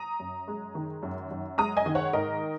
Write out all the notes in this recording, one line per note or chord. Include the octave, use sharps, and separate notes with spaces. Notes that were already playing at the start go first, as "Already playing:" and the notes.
Already playing: A#5 D#6
F#2
G#3
D#3
F#2
F#2
G#3 A#5 D#6
D#5 G#5
D#3
C#5 F#5
G#2 A#4 D#5